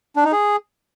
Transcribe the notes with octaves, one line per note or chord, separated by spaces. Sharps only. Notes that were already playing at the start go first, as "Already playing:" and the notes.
D4
D#4
G#4